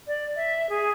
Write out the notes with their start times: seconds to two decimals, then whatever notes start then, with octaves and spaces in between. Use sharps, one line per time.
0.07 D5
0.36 E5
0.69 G#4